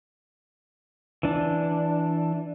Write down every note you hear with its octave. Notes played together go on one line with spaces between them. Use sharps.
E3 D4